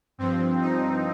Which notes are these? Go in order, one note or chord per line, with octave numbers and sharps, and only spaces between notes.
G2 F3 C4
D#4